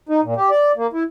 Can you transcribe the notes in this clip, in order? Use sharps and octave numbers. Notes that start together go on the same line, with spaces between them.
D#4
A#2
G4
D5
A#3
E4